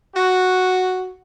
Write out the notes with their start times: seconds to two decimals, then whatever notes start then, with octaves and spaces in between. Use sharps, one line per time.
0.15 F#4